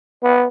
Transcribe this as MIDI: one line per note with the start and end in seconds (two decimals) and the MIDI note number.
0.23 0.48 59